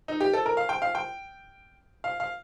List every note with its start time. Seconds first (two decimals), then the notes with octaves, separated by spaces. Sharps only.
0.08 D#4
0.20 G4
0.33 A4
0.46 A#4
0.57 F5
0.69 G5
0.82 F5
0.95 G5
2.04 F5
2.20 F5